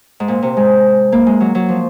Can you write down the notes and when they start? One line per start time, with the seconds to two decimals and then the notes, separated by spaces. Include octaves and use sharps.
0.20 G#2
0.28 A#2
0.42 C3
0.57 G#3
1.12 A#3
1.26 G#3
1.40 F#3
1.55 F#3
1.69 F3